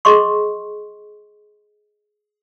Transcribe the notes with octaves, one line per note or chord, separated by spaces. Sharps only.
G#4 D#5 C6 C#6